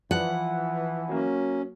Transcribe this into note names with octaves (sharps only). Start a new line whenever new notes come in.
E3 F3 F#5
F#3 A#3 C#4